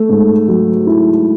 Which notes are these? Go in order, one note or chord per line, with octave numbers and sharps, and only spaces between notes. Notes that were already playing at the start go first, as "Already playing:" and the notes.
Already playing: A3
G#2
F#3
E4